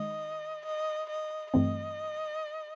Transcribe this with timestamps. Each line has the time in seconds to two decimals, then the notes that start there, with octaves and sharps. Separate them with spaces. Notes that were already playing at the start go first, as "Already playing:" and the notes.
Already playing: D#3 G#3 D#5
0.65 D#5
1.09 D#5
1.53 G2 E3 A3 C4 D#5